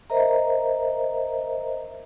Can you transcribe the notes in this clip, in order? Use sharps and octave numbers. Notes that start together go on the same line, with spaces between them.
A#4 C5 D#5 E5 A#5